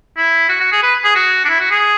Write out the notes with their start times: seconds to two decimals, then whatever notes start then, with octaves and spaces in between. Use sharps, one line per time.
0.17 E4
0.49 F#4
0.60 F#4
0.72 G#4
0.83 B4
1.04 G#4
1.15 F#4
1.45 D4
1.49 E4
1.60 F#4
1.71 G#4